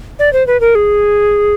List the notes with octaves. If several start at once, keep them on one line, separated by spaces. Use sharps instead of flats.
D5
C5
B4
A#4
G#4